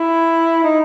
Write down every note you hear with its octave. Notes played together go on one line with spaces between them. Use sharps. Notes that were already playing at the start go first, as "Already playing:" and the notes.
Already playing: E4
D#4